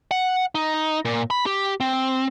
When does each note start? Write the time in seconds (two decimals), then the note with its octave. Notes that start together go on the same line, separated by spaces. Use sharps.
0.11 F#5
0.55 D#4
1.05 A#2
1.30 B5
1.46 G4
1.80 C4